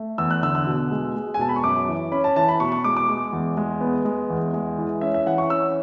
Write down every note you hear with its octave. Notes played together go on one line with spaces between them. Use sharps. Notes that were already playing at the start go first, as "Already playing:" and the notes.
Already playing: A3
E2 E6
F#6
D3 E6
E6
B2
G#3
G#3
G#5
B2 A5
B5
C#6
F#2 D6
E3
C#4 B5
A5
E3 A5
B5
B2 C#6
C#6
G#3 D6
D6
G#3
E2
G#3
B3
G#3
E2
G#3
E3
C#4 E5
E5
E3 F#5
C#6
C#4 E6